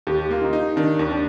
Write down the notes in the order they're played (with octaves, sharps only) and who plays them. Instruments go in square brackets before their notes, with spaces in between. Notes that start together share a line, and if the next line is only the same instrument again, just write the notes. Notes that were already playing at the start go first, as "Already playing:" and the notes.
[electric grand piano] D#2 [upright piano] G4
[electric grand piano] A#3 [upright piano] F4
[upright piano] D#4
[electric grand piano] D#4
[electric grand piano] D#3 [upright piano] D4
[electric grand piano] D#2
[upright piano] D4